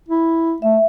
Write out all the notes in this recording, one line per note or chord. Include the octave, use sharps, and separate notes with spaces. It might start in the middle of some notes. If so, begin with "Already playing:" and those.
E4
A3 E5